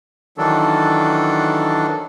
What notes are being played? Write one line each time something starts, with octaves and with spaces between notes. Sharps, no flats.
D#3 E3 F#3 D4 A4